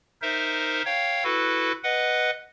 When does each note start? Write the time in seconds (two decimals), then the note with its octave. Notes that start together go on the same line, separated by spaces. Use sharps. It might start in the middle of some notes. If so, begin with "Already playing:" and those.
0.22 D#4 A#4 C5 E5
0.85 C#5 F5 G5
1.24 E4 F#4 A4 B4
1.83 B4 D#5 F#5